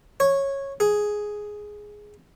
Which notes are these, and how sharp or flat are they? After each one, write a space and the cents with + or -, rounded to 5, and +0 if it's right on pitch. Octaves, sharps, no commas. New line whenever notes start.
C#5 -10
G#4 +5